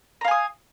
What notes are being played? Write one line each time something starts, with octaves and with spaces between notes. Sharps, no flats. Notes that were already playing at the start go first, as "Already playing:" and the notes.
F5 G#5 A#5 D#6